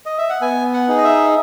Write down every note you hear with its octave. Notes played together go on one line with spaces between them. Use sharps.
D#5
E5
F#5
B3 G#5
F#5
D#4 G#4
D#5
E5